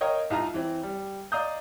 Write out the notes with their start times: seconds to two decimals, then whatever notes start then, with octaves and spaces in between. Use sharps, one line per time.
0.01 A#4 C#5 D#5 F5 G5
0.30 C2 D#4 F4 D#5 A#5
0.54 E3 C4
0.83 G3
1.32 D5 D#5 F5 A#5 D#6 G6